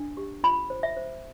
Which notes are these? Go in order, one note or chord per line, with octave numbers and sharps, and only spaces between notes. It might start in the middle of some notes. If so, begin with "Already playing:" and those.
Already playing: D4
G4
F4 B5
C5
E5
C5